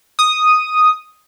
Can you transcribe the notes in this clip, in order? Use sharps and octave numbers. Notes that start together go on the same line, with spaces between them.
D#6